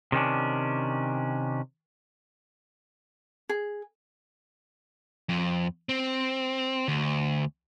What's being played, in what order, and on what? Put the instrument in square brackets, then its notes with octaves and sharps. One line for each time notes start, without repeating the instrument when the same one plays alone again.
[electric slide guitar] C3 D#3 C#4 D4
[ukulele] G#4
[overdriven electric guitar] F2
C4
D2